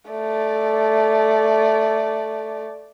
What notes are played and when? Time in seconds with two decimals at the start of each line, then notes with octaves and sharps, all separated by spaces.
0.11 A3 D5